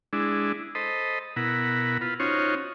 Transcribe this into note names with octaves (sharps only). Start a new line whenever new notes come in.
G#3 D4 E4
A4 C5 D#5 B5
B2 E4 A#4 F#5 B5
F4 B4
C#4 D#4 F4 F#4 C5 C#5